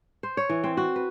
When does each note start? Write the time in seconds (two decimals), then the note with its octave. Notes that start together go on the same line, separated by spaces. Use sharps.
0.23 C5
0.37 C#5
0.49 E3
0.64 C4
0.77 F#4
0.96 B4